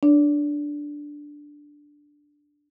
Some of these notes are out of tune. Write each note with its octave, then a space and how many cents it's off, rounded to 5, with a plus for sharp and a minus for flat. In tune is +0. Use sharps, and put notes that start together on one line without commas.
D4 +0 D5 -40